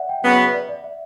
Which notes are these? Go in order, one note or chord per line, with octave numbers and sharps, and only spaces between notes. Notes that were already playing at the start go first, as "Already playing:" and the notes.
Already playing: D5 E5 F#5
G5
C#3 F#3 B3 F#5
E5
F#5
D5
D5
E5